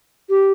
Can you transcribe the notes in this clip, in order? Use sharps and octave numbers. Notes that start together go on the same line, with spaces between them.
G4